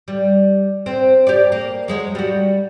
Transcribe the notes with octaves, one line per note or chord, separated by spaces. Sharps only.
G3
C4
G4 D5
A#3
F#3 G#3 C#4
G3 F#4